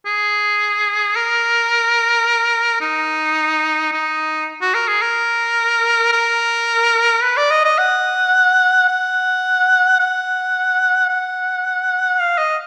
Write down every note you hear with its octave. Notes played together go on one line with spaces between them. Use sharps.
G#4
A#4
D#4
D#4
F#4
A#4
G#4
A#4
A#4
B4
D5
D#5
D#5
F#5
F#5
F#5
F#5
F5
D#5